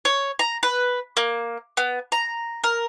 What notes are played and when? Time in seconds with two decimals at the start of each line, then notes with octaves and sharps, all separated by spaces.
0.05 C#5
0.39 A#5
0.63 B4
1.17 A#3
1.77 B3
2.12 A#5
2.64 A#4